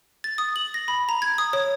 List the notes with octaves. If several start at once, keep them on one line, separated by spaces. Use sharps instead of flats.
A6
D#6
F#7
A#6
B5
A#5
G#6
D#6
C#5